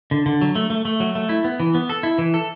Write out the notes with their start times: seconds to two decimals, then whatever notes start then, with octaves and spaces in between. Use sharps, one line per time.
0.11 D3
0.26 D3
0.41 F#3
0.55 A3
0.70 A3
0.85 A3
1.00 F#3
1.15 A3
1.29 E4
1.45 B3
1.60 E3
1.75 B3
1.89 A4
2.03 E4
2.18 E3
2.34 A4